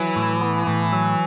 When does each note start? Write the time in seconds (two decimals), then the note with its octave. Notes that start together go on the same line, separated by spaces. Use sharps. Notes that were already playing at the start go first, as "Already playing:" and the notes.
Already playing: E3 F#3
0.16 A2
0.41 B3
0.67 A2
0.93 F#3